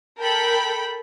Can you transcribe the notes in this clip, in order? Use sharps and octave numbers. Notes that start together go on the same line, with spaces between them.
A4 A#4 G5 B5